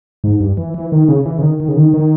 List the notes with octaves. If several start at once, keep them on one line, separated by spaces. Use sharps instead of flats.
G#2
G2
E3
E3
D#3
C#3
E3
C#3
D#3
D#3
C#3
D#3
D#3